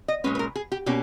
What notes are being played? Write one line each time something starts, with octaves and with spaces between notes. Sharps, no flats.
D#5
A#2 G#3 C#4 B4
B4
A#4
G#4
G4
B2 A#3 C#4 G4